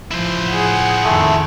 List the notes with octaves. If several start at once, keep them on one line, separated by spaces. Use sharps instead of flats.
A1 F3 E4 C5
G#4 F#5
F2 D#3 A3